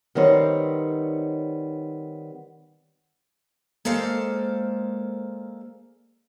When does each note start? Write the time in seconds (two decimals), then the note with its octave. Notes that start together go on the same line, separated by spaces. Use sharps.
0.15 D#3 G3 B3 C4 C#5
3.85 G#3 A#3 A4 C5 D5 F5